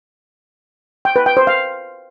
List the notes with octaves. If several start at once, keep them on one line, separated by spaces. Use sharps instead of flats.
G5
B4
G5
C5
F5